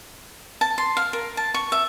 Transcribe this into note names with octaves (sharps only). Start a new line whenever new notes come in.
A5
C6
F5
A#4
A5
C#6
E5